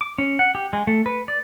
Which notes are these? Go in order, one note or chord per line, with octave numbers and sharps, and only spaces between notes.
D6
C#4
F#5
G4
G#3
A3
B4
D5